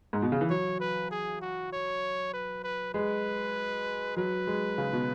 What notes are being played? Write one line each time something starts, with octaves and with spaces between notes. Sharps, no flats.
G#2
B2
C#3
E3
F#3 C#5
B4
G#4
F#4
C#5
B4
B4
G#3 B4
F#3 B4
G#3
C#3
B2